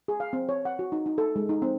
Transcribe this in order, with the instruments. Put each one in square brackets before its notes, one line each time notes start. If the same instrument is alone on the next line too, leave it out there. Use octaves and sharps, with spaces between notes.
[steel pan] G#4
F5
C4
C#5
F#5
F#4
D#4
D#4
A4
G#3
D#4
C4